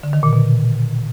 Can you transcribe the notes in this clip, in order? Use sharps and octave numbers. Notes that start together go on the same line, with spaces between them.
D3
D#3
A#2
B2